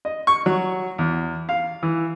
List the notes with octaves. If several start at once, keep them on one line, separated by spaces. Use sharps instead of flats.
D#5
C#6
F#3
E2
F5
E3